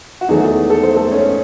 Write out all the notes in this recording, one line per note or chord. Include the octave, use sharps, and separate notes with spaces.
F#4
E2 D#3 F#3 G#3 A3 G#4
A4
C5
A3 A4
C#4 C#5